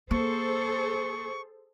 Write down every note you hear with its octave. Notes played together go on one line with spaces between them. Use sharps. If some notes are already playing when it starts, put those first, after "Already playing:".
A#3 G#4 A4 C5 C#6